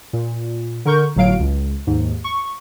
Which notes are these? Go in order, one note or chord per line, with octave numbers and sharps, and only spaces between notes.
A#2
D3 A#4 C#6 G6
G1 A2 F#3 F5 D7
C#2
D#2 G#2
C#6